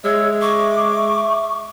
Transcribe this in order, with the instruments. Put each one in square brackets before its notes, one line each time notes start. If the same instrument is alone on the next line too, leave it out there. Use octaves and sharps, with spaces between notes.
[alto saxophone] G#3 [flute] C#5 [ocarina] E5 [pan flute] E6
[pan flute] C#6 [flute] D6